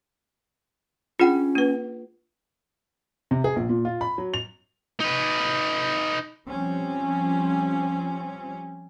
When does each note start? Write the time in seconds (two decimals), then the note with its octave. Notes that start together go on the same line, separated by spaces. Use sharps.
1.20 C#4 D4 F4 G#4 F#5 G5
1.55 A#3 B4
3.31 C3
3.44 G#4
3.56 A#1
3.69 A#2
3.85 F4
4.01 B5
4.18 F#3
4.34 F7
5.00 D#4 B4
6.48 F3 G3 C4 C#4